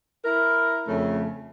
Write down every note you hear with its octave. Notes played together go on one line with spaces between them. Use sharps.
E4 A#4
F2 C#3 A3